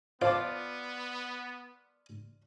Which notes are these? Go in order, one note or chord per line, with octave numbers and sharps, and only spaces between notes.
B3 F4 C5 D5 A5 D6